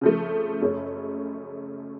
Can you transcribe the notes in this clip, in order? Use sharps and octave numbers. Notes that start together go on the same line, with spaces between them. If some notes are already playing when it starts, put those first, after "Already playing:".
C#3 F3 A3
F#1 F#2 C#3 A3 C#4